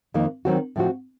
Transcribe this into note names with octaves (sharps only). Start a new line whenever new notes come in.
F2 D#3 A#3
D#3 F#3 C4 F#4
A2 F3 C4 F#4